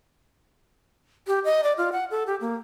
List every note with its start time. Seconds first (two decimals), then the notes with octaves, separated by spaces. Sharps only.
1.27 G4
1.44 D#5
1.63 D5
1.78 F4
1.92 F#5
2.11 A4
2.27 G4
2.41 A#3